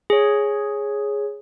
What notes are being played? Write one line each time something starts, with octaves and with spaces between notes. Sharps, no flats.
G#4 C#5